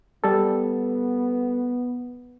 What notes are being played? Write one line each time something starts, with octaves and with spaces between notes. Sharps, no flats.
G3 B3 A4